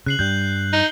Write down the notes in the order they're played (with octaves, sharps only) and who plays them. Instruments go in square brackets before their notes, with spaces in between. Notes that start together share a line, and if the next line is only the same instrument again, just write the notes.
[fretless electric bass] C#3 [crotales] F#6 C7 F#7
[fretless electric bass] G2 G3 [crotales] G6
[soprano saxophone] D#4 [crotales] F#6 C#7 G7